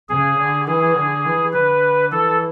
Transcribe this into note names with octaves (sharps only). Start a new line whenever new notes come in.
C#3 G#4
D3
E3 G#4
D3
E3
D3 B4
E3 A4